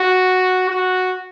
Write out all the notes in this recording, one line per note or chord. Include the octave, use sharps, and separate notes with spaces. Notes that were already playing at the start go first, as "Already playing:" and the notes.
Already playing: F#4
F#4